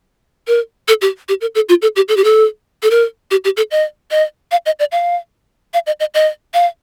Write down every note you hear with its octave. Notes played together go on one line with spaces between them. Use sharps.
A#4
A4
G4
G4
A#4
A4
F4
A4
G4
A4
G4
A4
A4
A#4
G4
G4
A4
D#5
D#5
F5
D#5
D5
F5
F5
D#5
D#5
D#5
F5